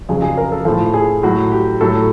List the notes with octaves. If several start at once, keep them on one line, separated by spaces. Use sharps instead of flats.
F2 C#3 F#3 G#4
G#4
A#4
A4
A2 F3 A4
G#4
A2 F#3 F#4
G4
A2 F#3 A4